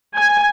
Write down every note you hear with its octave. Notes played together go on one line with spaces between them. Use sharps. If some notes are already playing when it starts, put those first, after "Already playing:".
G#5